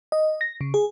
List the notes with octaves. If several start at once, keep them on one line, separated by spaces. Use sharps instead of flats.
D#5
A#6
C#3
G#4